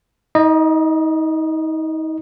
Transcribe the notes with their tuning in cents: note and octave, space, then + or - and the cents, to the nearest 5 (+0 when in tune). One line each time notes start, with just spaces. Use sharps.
D#4 +35 D#5 -20